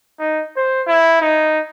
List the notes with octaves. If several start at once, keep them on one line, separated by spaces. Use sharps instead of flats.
D#4
C5
E4
D#4